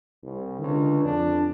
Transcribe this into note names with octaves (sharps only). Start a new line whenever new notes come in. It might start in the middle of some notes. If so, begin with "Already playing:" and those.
C2
C#2 D3
F2 D4